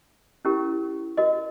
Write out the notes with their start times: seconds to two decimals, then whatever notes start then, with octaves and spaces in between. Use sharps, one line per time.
0.45 C#4 E4 G4 A#4
1.17 F#4 A#4 D#5